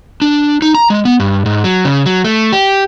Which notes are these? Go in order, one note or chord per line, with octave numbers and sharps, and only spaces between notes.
D4
D#4
A#5
G#3
B3
G2
G#2
F#3
C#3
F#3
A3
G4